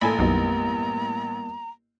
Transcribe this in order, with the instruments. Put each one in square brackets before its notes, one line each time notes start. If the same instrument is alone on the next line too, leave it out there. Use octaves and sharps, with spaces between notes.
[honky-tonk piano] A1 [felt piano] A#2 [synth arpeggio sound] A4 G#5 B5 [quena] A#5
[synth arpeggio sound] B1 F#2 D#4 [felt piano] G3 A#3 B3